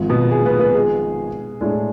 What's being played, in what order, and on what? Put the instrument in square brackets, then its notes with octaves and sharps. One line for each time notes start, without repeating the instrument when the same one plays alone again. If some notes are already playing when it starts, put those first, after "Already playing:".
Already playing: [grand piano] G#1 G#2 F3
[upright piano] B2 B3
G#3 G#4
B3 B4
B3 B4
G#3 G#4
[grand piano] A2 G#3 D4